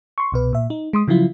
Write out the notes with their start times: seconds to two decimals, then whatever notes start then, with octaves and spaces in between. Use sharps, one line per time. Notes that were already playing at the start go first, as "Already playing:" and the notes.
0.18 C6 C#6
0.32 C2 B2 B4
0.53 A#2 E5
0.70 D#4
0.93 G#3 C6 D#6
1.08 C#3 F3 F#3 E4 F4